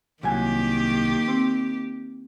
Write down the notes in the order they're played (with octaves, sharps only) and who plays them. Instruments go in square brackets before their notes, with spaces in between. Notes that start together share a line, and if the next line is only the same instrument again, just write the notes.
[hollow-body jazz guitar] C2 F#3 G#5 [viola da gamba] D#3 A#3 G4
[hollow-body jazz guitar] C4